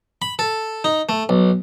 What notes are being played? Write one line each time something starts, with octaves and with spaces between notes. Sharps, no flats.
B5
A4
D#4
A3
B1